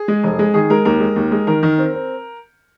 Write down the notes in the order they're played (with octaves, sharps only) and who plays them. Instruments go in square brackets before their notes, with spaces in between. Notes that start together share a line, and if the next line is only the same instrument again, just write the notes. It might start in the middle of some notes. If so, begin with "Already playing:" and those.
Already playing: [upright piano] G#4
G#3
F1
G#3
D#3 G#4
G#3 A#4
D#2 A#4
G#3
D#2
G#3
D#3 A#4
D#3
C4
C4